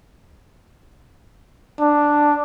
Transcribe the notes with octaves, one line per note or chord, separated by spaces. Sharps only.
D4